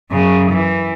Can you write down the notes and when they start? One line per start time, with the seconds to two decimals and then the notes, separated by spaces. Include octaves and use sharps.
0.11 F#2 C#3
0.51 E3